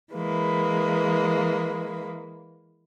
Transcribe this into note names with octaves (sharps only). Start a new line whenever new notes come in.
E3 G#3 A#3 B4